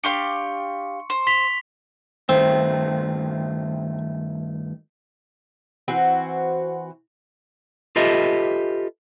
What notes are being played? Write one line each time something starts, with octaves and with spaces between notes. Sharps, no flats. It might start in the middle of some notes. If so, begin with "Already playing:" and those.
D4 G4 F5 C6 C#6 C#7
C5
C6 B6 F7
G2 D#3 A3 C4
E3 C4 F#4 C5
F4 G4 A4 B4 D#5 E5